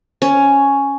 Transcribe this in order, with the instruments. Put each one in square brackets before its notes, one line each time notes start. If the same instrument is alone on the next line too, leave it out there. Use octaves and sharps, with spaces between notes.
[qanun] C#4